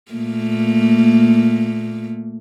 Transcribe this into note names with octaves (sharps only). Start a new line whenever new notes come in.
A#2 A3 A#3